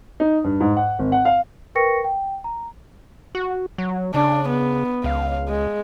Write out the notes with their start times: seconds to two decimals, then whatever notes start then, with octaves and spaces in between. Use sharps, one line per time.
0.20 D#4
0.44 G2
0.60 G#2
0.77 F#5
0.99 G#1
1.12 F#5
1.25 F5
1.75 A#4 B4 G5 C#6 A#6 C#7
2.04 G5
2.44 A#5
3.35 F#4
3.78 F#3
4.14 C#3 D4
4.49 B3
5.04 C#2 F5
5.49 G#3